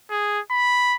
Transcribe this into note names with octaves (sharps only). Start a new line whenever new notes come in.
G#4
B5